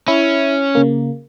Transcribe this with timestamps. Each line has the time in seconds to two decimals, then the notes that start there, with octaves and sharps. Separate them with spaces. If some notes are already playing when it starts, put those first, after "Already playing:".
0.08 C#4 E4
0.75 C#3 A#3